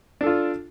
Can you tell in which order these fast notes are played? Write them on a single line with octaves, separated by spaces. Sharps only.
D4 A4 F4